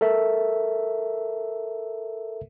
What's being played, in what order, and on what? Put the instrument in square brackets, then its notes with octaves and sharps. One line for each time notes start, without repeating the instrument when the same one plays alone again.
[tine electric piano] A4 A#4 E5